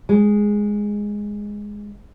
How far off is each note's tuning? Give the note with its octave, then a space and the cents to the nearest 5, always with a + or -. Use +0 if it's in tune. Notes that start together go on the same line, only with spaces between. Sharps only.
G#3 -5